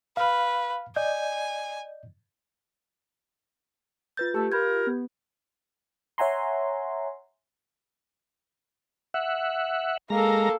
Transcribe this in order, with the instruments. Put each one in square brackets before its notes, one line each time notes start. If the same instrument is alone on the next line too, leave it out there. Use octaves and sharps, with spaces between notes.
[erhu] B4 [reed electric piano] F5 F6
[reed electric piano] D5 D#5 G6 [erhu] G#5
[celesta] F4 B4 G6 [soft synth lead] A6
[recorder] A3 [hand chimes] G4 [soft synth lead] A4
[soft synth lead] F4 [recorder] A#4 [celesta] B5 G6 G#6
[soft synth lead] B3
[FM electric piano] C#5 E5 F#5 G#5 A#5 C6
[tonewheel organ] E5 F#5
[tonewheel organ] G#3 A#5 [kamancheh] A#3 A4